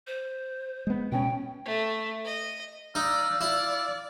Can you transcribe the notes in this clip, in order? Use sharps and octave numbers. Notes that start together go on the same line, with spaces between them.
C5
G#3 B3
B2 C#4 G5
A3
D#5
D#4 D5 F5 E6
E4 D5